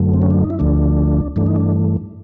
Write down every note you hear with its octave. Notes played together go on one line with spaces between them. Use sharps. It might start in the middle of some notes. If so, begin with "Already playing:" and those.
Already playing: F#2 D3 F#3 A3
C4
C#4
D4
D#4
E4
D2 D3 F3 A3 D4
G2 E3 A3 D4
D#4
D4